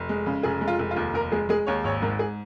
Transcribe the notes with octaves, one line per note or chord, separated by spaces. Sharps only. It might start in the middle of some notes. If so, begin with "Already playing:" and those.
Already playing: F1
G#3
C#3
F1 G#4
G#3
F4
F1
F4
D#2
F1 A#4
G#3 G#4
G#3 G#4
D#2 C#5
G#1 C#5
G#2 A#4
G#4